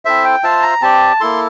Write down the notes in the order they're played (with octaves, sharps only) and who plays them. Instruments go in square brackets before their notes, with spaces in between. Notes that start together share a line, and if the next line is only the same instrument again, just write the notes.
[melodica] C4 E4 A4 C5 [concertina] E5
[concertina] G5
[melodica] F4 C5 E5 [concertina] A5
[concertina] A#5
[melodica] C4 G4 D5 [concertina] A5
[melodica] A#3 E4 A4 [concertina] C6